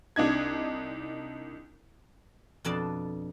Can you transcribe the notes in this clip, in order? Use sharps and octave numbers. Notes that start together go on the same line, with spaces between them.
C2 D4 D#4 G#6
F2 B2 D4 D5 D#5 A5